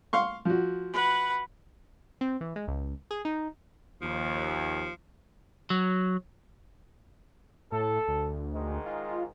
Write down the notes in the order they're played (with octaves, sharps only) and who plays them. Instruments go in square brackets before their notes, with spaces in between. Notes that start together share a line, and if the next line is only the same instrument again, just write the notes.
[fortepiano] F5 C6 C#6
F3 F#4
[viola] B4 F#5
[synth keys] C4
E3
G#3
C#2
G#4
D#4
[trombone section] D#2 [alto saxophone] F3
[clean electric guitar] F#3
[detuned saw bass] A2 [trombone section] A4
[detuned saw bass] D2
[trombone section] G#2 D#3 G#3
[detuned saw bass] F4